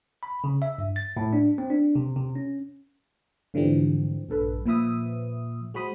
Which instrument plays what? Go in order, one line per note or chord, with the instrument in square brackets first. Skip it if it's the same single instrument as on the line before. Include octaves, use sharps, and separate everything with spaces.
[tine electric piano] B5
C#3
E5
G2
A6
A2
D4
C4
D4
C3
C3
C#4
[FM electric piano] G#2 D3 E3 F3 G3 C4
A#1 G2 A4 B4
A#2 F3 B4 E5 D#6
G#3 F#4 C5 B5 D#6